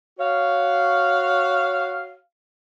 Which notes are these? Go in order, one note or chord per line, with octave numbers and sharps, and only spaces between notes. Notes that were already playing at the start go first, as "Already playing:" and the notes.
F#4 C#5 F5